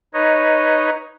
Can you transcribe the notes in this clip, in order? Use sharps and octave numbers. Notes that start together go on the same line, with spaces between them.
D#4 B4 C#5 D#5